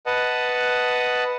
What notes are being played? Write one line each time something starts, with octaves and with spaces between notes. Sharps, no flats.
B4 D#5 F#5 A5